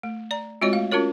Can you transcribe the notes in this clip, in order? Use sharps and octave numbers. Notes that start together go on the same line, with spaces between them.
A3
D5 A#5
G#3 C4 F4 F#4 C#5 D#5
A3 F5
C#4 F4 F#4 A#4 C#5